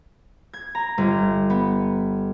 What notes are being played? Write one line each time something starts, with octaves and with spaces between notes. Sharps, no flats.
G#6
A#5
G1
B3